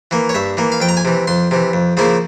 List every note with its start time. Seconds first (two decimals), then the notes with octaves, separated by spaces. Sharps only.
0.11 E3 A#3
0.29 C#5
0.35 G2 E5
0.57 E3 A#3
0.72 F5
0.80 F2 G5
0.89 A#5
0.97 G#5
1.05 C3 E3
1.27 F2 C6
1.51 C3 E3
1.73 F2
1.97 C#3 F3 A#3 E4